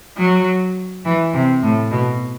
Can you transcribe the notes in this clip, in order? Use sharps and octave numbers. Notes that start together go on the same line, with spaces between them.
F#3
E3
C3
A2
B2